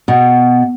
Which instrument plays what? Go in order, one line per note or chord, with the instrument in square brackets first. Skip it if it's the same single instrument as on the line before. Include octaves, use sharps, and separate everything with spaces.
[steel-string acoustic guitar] B2